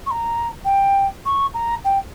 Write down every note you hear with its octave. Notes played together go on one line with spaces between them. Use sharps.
C#6
A#5
G5
C#6
A#5
G5